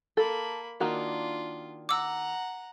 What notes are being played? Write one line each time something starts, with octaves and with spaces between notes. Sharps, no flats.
A#3 A4 B5
D#3 A#3 D4 F4 F#4
F#5 A#5 D6 E6